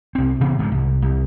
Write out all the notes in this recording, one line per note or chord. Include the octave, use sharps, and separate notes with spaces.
C2 C4
C3 E3 B3 C4
G#2 D3 E3 F3
C2
C2